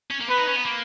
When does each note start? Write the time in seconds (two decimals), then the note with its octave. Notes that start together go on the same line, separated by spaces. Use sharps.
0.10 C#4
0.20 A#3
0.29 B3 B4
0.38 D#4
0.47 C#4
0.56 B3
0.65 A#3